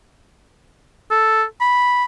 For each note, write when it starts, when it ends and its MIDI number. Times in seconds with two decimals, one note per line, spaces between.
1.11 1.43 69
1.61 2.04 83